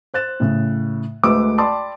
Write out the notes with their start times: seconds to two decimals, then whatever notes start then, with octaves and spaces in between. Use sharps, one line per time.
0.14 C5 F#6 A6 E7
0.40 A2 C#3
1.24 D2 G#3 A3 B4 D6 E6
1.58 D5 G5 A5 B5 C6 D6